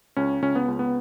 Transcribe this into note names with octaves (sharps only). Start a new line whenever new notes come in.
C#2 C#4
C#2 C#4
B3
C#2
B3